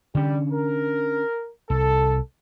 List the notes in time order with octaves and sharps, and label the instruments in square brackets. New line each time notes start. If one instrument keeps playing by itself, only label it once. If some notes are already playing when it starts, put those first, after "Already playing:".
[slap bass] D3 C#4 [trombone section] G3
[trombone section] A#4
[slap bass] C2 [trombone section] A4